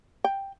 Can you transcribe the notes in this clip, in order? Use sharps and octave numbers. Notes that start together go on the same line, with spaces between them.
G5